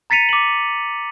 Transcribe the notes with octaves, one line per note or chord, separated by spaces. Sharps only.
A#5 A6 B6 C#7 D#7 F7
D6 F#7